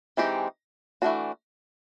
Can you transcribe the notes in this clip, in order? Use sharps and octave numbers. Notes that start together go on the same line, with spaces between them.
E3 G#3 C4 D#4 G4
E3 A3 D4 F#4